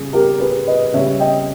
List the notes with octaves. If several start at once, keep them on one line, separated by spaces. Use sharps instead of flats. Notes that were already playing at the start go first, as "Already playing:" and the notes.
Already playing: C#3 G3 G#4
G4 A#4
G#4 B4
B4 D#5
C#3 G3 C#5 E5
D#5 G5